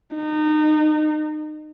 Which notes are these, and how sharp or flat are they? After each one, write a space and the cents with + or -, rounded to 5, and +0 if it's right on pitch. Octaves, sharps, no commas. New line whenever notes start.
D#4 -30